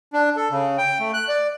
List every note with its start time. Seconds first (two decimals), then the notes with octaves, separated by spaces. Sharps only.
0.13 D4
0.37 A4
0.51 C#3
0.78 G5
1.00 A3
1.14 F#6
1.28 D5